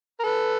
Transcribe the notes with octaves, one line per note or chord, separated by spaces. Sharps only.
A#4
A4 B4